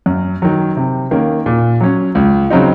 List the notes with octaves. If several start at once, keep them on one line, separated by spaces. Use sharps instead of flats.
F#2
D#3 F#3
C3
D#3 A#3 C#4
A#2
F#3 C#4
C#2
C#3 F#3 C4 D#4